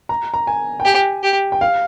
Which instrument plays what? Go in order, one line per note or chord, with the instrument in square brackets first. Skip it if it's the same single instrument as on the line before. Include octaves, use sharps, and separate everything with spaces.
[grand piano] A#5
A#5
G#5
G5
[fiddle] G4 [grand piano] G#5
[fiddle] G4
[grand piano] G5
F5